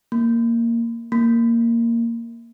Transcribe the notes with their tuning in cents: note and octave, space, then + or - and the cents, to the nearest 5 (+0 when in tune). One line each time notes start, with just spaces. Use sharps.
A#3 -5
A#3 -5